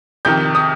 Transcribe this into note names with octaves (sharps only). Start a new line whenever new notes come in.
F2 C3 D#3 G6
D#6